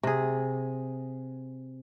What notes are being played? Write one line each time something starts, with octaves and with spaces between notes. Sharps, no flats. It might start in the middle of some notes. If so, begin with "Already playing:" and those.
C3 G#4